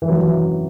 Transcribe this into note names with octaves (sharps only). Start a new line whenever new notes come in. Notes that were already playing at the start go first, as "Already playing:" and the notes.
E3
F#3
E3